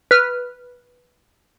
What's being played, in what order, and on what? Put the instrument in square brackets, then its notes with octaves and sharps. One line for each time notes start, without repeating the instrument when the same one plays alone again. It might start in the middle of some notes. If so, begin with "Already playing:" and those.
[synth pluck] B4 F6